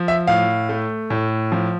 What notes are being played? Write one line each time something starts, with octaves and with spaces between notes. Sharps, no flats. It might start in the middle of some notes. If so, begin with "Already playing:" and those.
Already playing: F3
E5
A2 F5
A3
A2
F3